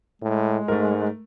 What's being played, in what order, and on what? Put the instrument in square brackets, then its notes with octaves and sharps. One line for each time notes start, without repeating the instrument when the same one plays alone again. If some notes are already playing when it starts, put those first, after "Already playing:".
[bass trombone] A2 [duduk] G#3
[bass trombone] G#2 [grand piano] A3 A#4